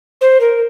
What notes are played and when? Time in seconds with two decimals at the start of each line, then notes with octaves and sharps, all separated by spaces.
0.21 C5
0.40 A#4